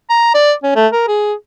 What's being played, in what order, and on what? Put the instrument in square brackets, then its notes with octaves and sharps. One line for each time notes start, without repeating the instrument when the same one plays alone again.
[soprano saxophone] A#5
D5
C#4
A3
A#4
G#4